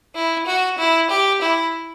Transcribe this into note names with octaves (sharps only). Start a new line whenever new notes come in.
E4
F#4
E4
G4
E4